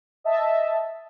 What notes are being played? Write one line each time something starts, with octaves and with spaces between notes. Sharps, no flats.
D#5 E5 A5